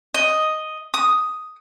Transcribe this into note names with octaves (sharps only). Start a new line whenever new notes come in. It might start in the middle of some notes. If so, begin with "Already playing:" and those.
D#5
D#6